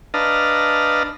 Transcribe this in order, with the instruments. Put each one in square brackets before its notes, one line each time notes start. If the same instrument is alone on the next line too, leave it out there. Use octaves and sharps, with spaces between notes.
[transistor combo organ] D4 B4 D#5 F5 A5 A#5